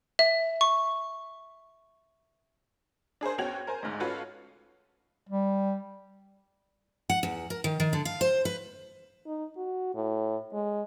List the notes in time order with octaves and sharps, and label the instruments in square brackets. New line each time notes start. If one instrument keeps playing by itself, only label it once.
[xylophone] E5
C#6
[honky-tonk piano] D4 G#4 A#4 C5
E2 C#4 F#4 G5 G#6 F7
A#4 C5 G#5
G#1 D2 G#2
C#4 F4 F#4 A4 B4 C#5
[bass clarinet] G3
[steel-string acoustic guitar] F#5
E2
A#4
D#3
D#3
D3
F5
C5
B4
[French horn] D#4
F#4
A2
G#3